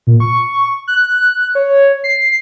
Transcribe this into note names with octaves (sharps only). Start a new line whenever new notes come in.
A#2
C#6
F#6
C#5
C7